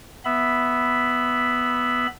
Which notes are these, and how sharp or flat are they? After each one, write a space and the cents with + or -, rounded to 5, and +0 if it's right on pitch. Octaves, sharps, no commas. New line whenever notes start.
B3 +0 E5 +0 B5 +0